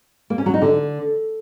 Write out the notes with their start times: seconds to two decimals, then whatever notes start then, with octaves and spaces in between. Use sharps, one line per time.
0.30 A#3
0.38 C#4
0.46 F#3
0.54 D#4
0.62 D3